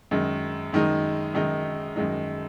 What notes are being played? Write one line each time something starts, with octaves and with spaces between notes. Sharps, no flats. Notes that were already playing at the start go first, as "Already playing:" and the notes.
F#2 D#3 G#3 D#4
F#2 D#3 G#3 D#4
F#2 D#3 G#3 D#4
F#2 D#3 G#3 D#4